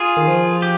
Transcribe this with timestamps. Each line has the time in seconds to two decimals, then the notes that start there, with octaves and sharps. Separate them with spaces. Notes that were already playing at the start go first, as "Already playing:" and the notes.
Already playing: F4 G#4
0.17 D#3
0.28 F3
0.62 G4